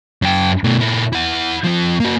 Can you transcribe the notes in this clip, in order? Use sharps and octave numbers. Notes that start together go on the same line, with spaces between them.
F#2 G5
B2 A3
A#2 E4
E4 F#5
F3 C4
A#3 F#4